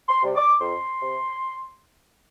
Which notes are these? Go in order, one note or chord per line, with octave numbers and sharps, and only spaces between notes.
C6
C3 G3
D6
F2 C6
C3